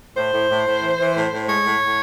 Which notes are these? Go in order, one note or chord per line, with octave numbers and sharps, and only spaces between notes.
A2 C5
A2
A2
A2
E3
E3
A2
A2
G#3 C#5
A2
A2